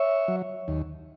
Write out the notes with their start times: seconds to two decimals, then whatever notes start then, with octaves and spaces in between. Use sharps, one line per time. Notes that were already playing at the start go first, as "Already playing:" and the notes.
Already playing: C#5 E5
0.28 F#3
0.68 D#2